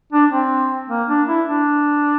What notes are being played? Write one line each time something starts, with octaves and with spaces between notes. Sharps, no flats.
D4
C4
A#3
D4
E4
D4